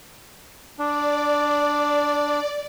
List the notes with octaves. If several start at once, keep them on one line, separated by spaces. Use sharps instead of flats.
D4 D5